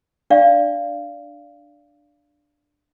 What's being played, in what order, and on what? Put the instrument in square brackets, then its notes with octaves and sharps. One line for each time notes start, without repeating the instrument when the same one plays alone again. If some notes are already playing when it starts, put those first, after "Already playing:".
[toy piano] D4 D5 F5